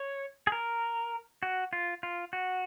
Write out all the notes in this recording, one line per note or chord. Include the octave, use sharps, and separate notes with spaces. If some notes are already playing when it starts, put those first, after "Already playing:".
Already playing: C#5
G#4
A#4
F#4
F4
F4
F#4